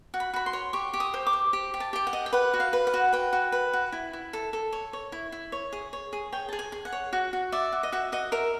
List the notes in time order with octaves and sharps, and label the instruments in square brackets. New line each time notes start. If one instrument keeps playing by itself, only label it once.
[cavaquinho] F#4
B5
F#4 B5
C6
C#5
G4 C#6
G4
D#6
C5
D6
C5
G4
G4
A5
G4 G5
F#5
D#5
G5
B4 F#5
F#4
F5
B4
F#5
F#4
B4 G5
F#4
B4
F#4
E4
E4
A4
A4
C#5
C#5
E4
E4
C#5
G#4
C#5
G#4
C#5 G5
G#4 A5
G#5
G#4
F#5
C#5
F#4
F#4
D5 E5
F#4
D#5
F#4 E5
F#4 D#5
A#4 E5